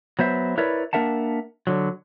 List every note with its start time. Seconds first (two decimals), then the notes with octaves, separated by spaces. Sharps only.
0.19 F#3 B3 C5 E5
0.58 E4 A#4 B4 C#5 D5 E5
0.93 A#3 D4 A#4 E5 F#5 A5
1.67 D3 F#3